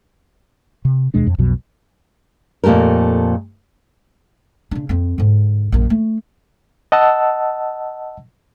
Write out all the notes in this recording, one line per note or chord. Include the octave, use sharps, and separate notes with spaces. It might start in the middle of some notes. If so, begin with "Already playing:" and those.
C3
D#2 B2 G#3 D4
F2
B1 F2 B2 F#3
F2 A#2 A3 G4 A#4
C#3 D4
F2 C4
G#2 D3
A#1 F#2
A3
D#5 F#5 A5 E6